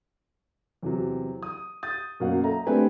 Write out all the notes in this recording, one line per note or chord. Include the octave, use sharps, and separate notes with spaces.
E2 C3 F#3
D#6
D#6 G6 A6
F#2 B2 A#3 C#4 F5 F#5
A4 E5 A#5
A3 C4 D4 G4 B4 G#5